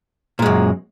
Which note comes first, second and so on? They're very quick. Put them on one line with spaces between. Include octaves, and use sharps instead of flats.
A#2 G#3 F#2